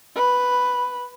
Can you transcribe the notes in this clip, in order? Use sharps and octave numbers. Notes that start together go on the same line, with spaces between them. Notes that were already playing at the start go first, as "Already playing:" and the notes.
B4